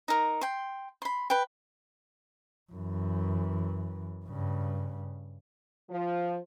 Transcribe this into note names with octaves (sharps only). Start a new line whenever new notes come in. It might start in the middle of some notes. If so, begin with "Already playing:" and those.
D#4 A#4
G5 C6
B5 C6
B4 G5
F#2 E3
G2 C#3
F3